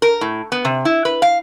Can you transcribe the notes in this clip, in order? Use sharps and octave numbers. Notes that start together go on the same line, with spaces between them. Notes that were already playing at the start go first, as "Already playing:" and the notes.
A#4
A2
B3
C3
E4
B4
F5